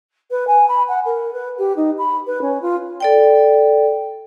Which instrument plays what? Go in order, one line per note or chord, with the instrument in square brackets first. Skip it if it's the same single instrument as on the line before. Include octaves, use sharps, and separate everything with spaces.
[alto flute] B4
G#5
B5
F#5
A#4
B4
G4
D#4
B5
B4
C#4
F4
[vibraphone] A4 D5 G5